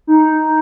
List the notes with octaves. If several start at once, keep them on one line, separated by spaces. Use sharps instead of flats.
D#4